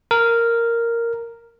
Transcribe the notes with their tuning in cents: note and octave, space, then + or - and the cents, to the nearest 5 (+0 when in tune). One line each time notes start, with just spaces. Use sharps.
A#4 -5